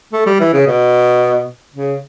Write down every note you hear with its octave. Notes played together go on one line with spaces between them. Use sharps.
A3
G3
E3
C#3
B2
C#3